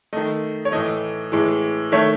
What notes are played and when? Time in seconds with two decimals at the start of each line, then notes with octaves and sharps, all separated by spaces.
0.13 D#3 A3 D#5
0.65 C#5
0.72 A2 E3 A3 D#5
1.32 A2 E3 G#3
1.92 D#3 A3 C#5 E5